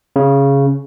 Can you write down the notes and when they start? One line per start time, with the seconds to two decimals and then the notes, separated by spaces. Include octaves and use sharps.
0.16 C#3